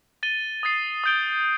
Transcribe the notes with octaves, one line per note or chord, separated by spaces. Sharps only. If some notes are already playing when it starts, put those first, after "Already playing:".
A6 D#7 G7
D#6 A6 C7
D#6 G6 D7 G7